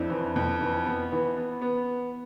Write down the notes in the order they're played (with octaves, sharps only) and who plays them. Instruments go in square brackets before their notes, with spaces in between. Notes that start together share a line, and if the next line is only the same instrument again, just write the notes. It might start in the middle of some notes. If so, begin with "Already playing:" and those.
Already playing: [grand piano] F2 [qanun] C4 D4 E4
[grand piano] E3
F2
E3
B3
E3
B3
B3